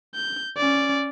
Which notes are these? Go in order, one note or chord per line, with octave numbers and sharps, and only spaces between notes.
G6
C#4 D5